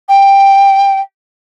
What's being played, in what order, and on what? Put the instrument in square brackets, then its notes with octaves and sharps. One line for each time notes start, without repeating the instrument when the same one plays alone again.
[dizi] G5